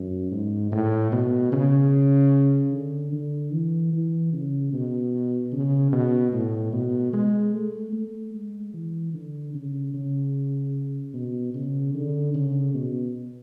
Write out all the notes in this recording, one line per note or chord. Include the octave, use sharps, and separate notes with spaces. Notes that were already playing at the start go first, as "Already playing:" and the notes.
Already playing: F#2
G#2
A2
B2
C#3
D3
D3
E3
E3
C#3
B2
C#3
B2
A2
B2
G#3
A3
A3
G#3
E3
D3
C#3
C#3
B2
C#3
D3
C#3
B2